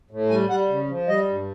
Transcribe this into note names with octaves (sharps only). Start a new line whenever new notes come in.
A2
G3 G#5
G3 F#5
C#3
F3
G3 D#5
G2